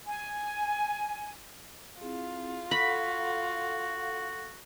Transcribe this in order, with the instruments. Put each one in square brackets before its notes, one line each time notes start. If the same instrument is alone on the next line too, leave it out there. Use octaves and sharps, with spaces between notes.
[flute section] G#5
[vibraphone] C4 E4 G#4 [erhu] F4
[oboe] F#4 [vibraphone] A4 F5 F#5 [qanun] B5